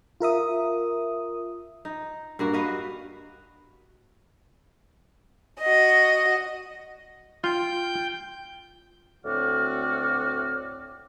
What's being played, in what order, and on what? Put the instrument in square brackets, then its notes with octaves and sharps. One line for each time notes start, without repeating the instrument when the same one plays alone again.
[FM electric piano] F4 A#4 E5 D#6
[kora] D#4
G2 A#3 F#4
F#4 B4 D#5 F5
[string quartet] F#4 D#5
[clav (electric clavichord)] F4 [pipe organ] G5 G6
[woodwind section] D2 A2 C4 F#4 D5 F6